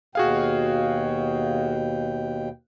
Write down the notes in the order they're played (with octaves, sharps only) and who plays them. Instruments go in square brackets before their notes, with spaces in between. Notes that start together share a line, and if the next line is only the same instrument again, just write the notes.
[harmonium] D#2 B2 G5 [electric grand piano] F#4 G#4 F5